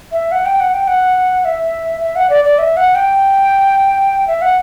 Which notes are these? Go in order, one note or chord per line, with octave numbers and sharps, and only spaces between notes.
E5
F#5
G5
F#5
G5
F#5
E5
E5
F#5
D5
D5
E5
F#5
G5
E5
F#5